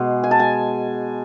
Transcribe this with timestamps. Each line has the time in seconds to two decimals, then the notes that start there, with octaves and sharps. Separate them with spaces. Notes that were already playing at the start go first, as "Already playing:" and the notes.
Already playing: B2 G#3
0.24 G#5
0.31 A5
0.40 G#5